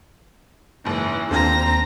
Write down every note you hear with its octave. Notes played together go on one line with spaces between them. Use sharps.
F#1 G#2 E3
D#2 C4 D4 F4 A4 C5 A#5